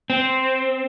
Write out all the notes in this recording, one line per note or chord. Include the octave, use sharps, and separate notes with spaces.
C4